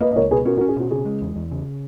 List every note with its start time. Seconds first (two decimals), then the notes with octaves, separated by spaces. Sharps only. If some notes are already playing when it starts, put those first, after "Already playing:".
0.01 A#3 B4 D#5
0.11 D#5
0.16 C#2 A#4 C#5
0.31 B2 G#4 B4
0.45 C#4 F#4 A#4
0.57 F#4 A#4
0.61 C#4
0.68 G#4
0.77 B2 F#4
0.91 C#3 G#4
1.05 G#3
1.22 E2
1.36 E2
1.52 C#3